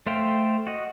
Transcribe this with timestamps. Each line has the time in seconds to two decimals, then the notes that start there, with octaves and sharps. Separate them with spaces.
0.06 A3 C5 E5 F5 G5
0.67 F#4 D#5